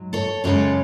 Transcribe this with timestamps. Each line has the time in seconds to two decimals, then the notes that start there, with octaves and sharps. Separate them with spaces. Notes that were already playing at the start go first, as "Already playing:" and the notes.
Already playing: G#2 F#3
0.13 A4 C#5
0.44 F#2 C#3 G#3 A4 C#5